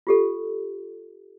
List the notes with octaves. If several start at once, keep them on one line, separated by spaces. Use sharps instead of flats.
F4 G4 A4